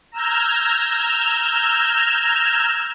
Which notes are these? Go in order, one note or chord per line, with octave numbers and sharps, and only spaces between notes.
A#5 E6 F6 G6 G#6